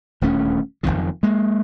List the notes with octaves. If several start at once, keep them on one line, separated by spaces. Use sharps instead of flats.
D#1 D2 A3 C#4
F#1 B1 F2 D#3
G#3 A#3